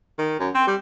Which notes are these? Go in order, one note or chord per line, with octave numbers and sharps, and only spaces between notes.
D#3
F#2
C4
G3